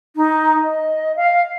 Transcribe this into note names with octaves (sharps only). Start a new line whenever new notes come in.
D#4
D#5
F5